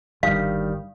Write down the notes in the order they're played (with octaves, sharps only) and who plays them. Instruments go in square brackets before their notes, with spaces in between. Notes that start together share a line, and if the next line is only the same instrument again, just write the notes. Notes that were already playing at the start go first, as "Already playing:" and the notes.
[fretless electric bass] G1 G2 [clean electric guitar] D#3 G3 [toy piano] F5